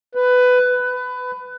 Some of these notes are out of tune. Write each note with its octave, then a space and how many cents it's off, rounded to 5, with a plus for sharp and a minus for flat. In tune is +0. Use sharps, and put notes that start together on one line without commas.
B4 +15
B4 +20